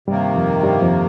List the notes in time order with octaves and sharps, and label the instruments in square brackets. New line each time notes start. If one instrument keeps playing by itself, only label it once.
[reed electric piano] G2 G3 [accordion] C3 D#3 A#3
[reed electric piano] F2 F3
G2 G3
F2 F3